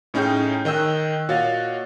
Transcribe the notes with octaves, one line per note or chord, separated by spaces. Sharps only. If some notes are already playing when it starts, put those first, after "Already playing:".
A2 C#4 D#4 G#4 G5 G6
D#3 D#5 G5 E6 F#6
A#2 F#4 C#5 D#5 F5 A6